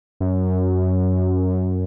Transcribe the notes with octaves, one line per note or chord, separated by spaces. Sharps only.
F#2